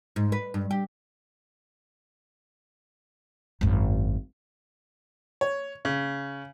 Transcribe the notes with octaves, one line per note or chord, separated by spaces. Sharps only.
G#2
B4
G2
G4
G#1 F#2
C#5
C#3